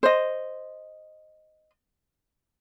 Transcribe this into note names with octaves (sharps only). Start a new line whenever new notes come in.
C5 D#5